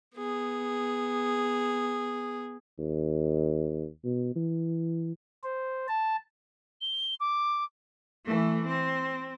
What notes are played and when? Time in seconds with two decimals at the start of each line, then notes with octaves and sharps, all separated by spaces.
0.17 B3 G#4
2.79 D#2
4.05 B2
4.36 E3
5.44 C5
5.88 A5
6.81 G7
7.20 D6
8.25 E3 A3
8.67 C4